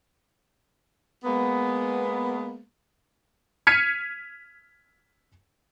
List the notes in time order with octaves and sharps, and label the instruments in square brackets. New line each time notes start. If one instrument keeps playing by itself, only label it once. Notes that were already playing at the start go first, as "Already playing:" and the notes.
[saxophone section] G#3 A#3 B3
[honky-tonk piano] F6 G#6 B6 C#7 D#7